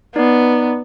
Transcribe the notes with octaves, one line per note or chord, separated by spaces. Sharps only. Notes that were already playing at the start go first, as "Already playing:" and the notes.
B3 D#4 B4 D5